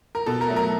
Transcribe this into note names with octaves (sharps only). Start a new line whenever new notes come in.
A#4
B2 A4
A#4
F#3 A3
A#4